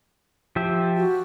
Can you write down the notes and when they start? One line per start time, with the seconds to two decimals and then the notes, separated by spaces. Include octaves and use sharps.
0.56 F3 G4 E5
0.97 F#4